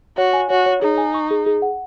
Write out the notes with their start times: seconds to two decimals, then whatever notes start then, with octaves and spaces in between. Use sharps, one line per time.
0.17 F#4 C#5
0.33 G#5
0.50 F#4 C#5
0.66 C#5
0.82 D#4 G#4
0.98 G#5
1.14 C#6
1.31 G#4
1.46 G#4
1.62 F#5